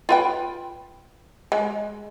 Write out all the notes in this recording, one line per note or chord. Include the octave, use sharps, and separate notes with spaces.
F4 B4 G5
G#3